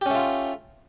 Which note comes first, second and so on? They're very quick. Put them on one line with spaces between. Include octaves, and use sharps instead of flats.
G4 C#4 A3 F4